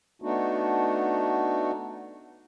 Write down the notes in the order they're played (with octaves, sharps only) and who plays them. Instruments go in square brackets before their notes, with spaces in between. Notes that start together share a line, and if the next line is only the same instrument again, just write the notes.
[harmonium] A3 B3 D4 D#4 F#4